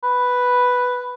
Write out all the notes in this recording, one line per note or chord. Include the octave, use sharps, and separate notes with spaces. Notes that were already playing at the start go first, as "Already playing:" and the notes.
B4